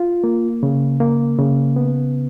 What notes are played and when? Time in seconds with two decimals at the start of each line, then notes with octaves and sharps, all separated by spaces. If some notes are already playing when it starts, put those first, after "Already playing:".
Already playing: F4
0.24 A#3
0.63 C#3
1.00 A#3
1.39 C#3
1.76 B3